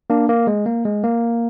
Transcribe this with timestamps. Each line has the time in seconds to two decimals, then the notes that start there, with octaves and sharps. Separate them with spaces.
0.10 A#3 D4
0.29 A#3
0.47 G#3
0.66 A#3
0.85 G#3
1.03 A#3